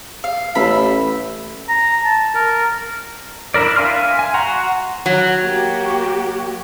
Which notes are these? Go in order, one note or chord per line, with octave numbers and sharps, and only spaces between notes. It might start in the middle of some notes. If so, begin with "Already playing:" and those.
F5
A1 E5 B5
A#5
A5
A#4
D4 E4 A#4 D5
E5 F5 G#5 C6 F6
G#5
F#4 F#5 A#5 C6
F#3
A#3 F#4 G4